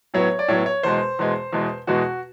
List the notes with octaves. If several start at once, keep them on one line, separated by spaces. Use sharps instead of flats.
A2 F#3 B3 C#5
D5
A2 F#3 B3 C#5
C#5
E2 B2 G#3 C5
E2 B2 G#3
E2 B2 G#3
E2 B2 G#3 F#4